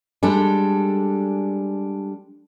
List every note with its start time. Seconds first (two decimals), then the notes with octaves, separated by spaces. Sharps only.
0.23 G3 G#3 D4 A4